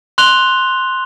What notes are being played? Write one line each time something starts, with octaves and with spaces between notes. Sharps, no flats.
C6 F#6 F7 G7